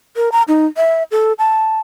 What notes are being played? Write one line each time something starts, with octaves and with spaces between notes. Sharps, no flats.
A#4
A#5
D#4
E5
A4
A5